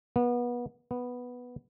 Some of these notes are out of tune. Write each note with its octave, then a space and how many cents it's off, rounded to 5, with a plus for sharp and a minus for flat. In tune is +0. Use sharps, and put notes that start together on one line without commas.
B3 -25
B3 +0